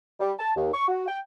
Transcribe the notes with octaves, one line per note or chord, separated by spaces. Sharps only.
G3
A5
D#2
C#6
F#4
G5